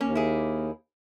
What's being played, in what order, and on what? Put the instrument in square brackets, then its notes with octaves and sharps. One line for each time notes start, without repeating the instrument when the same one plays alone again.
[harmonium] D#2 [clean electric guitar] A#3 [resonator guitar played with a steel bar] C#4
[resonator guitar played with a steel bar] E4 G#4